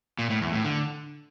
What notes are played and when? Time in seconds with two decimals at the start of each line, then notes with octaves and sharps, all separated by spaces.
0.19 A#2
0.30 A2
0.42 E2
0.53 A2
0.64 D3